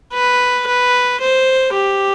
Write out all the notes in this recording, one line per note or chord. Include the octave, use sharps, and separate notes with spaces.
B4
B4
C5
G4